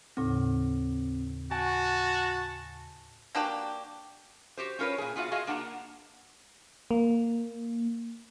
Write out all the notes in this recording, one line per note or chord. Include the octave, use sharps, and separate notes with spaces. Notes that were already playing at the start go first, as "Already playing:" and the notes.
D#2 A2 C#3 C4
F#4 G#5 A5
A#3 D4 F#4 G4
F#4 G4 C5
C#4 F4 A#4 B4 C#5
A#2 G#4
B3 F4 F#4 D#5 F5
F4 F#4 G#4 D#5 F5
A#3 D4 F#5 G5 A#5
A#3